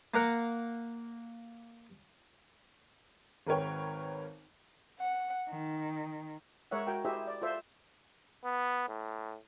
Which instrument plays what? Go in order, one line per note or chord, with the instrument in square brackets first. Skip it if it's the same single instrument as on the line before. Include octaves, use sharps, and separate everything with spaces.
[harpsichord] A#3 A#4 F#5
[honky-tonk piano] G#1 A#4 B4 C#5 G5
[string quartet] F#5
D#3
[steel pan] G#3 A#4 C#5 E5 F#5
F#4 A#4 G5
E4 G4 G#4 C5 D#5 E5
D5
F4 A4 C5 E5
[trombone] B3
A2